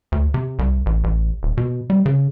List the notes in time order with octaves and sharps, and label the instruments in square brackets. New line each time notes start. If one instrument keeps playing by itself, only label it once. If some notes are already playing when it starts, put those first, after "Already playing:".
[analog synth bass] D2
C3
C2
A1
A1
D#1
B2
G3
C#3